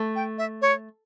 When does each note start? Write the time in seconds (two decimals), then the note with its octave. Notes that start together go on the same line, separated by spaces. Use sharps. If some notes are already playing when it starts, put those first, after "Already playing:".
Already playing: A3
0.16 G5
0.38 E5
0.62 C#5